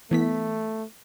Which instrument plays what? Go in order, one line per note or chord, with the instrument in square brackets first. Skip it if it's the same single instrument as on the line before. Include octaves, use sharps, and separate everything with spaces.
[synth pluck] E3 B3 B6 [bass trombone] A3